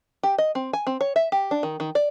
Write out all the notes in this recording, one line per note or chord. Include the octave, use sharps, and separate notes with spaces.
G4
D#5
C4
G#5
C4
C#5
E5
G4
D4
D#3
D#3
D5